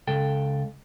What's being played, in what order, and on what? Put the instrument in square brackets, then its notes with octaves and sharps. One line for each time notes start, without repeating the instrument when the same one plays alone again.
[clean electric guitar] C#2 A4 G5